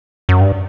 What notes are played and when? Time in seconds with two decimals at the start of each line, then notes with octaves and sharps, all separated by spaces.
0.29 F#2
0.41 G2